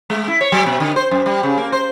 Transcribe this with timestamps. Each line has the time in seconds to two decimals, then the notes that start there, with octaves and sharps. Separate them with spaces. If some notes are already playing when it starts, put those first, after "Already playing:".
0.10 G#3
0.28 E4
0.41 C#5
0.52 F#3
0.66 B2
0.80 D3
0.96 C5
1.11 F#2
1.26 G3
1.43 C#3
1.57 A#3
1.72 C5